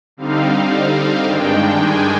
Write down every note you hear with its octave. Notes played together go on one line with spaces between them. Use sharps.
D3 G3 C4 D#4 F5
G2 D#3 G#3 D4 G5
G#5